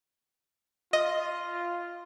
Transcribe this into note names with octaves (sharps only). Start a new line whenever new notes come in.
F4 D#5